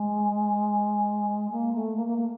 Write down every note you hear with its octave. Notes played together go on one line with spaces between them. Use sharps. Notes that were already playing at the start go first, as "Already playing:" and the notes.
Already playing: G#3
A#3
A3
A#3
A#3
A#3